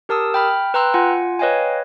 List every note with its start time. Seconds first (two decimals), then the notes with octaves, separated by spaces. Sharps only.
0.09 G4 A#4 A5 D#6 E6
0.34 G5 B5 F6
0.74 B4 G5 A#5 C6 E6 F#6
0.94 F4 F#5 G#5
1.39 B4 C#5 D#5 F5 G5 G#5